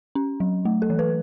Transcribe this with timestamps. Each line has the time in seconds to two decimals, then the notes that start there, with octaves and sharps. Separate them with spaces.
0.15 C#4
0.40 F#3
0.65 A3
0.82 A4
0.90 E3
0.99 B4